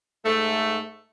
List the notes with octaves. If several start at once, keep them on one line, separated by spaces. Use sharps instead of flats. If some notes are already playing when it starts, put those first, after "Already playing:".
G#2 A3